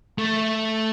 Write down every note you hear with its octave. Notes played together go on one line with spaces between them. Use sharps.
A3